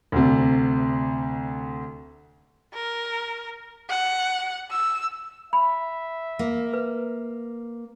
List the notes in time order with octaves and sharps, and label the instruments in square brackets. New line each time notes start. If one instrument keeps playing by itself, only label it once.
[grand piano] D2 C3
[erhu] A#4
F#5
E6
[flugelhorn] E5 [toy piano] B5
[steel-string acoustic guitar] A#3
[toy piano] B4